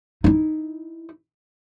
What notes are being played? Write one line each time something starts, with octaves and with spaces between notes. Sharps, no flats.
D#4 E4